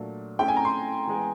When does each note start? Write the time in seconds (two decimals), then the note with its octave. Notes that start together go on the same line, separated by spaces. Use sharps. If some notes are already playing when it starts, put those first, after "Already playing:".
Already playing: A#2 F#3 A3 D4
0.39 A3 C#4 E4 G#4 G5
0.48 G#5
0.57 A#5
0.65 C6
1.07 E3 G#3 B3